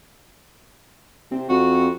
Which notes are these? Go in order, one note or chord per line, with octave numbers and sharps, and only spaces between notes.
C3 C4
F2 F#4